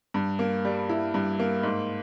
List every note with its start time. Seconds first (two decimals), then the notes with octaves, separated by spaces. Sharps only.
0.14 G2
0.39 A#3
0.65 G3
0.89 E4
1.14 G2
1.40 A#3
1.63 G#2